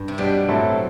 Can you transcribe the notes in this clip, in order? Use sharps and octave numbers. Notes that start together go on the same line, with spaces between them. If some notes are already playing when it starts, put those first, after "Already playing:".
Already playing: G2
C3
B2 G3 D4 G4
A2 F#3 C4 E4 A4